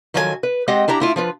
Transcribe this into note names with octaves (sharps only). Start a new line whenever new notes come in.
D#3 F3 F#3 A4 C5 G#5
B4
G#3 C4 G4 D#5 F#5 G5
D4 E4 G4 A#5
A3 E4 F4
F3 F4 B4